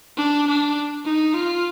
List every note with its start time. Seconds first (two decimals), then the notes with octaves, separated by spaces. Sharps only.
0.17 D4
0.47 D4
1.05 D#4
1.34 F4